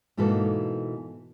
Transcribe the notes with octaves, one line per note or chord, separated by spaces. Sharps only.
G#2 B2 E3 A#3 B3 A4